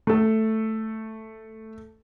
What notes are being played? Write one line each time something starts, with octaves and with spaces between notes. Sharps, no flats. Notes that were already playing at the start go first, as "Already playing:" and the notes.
A3 A4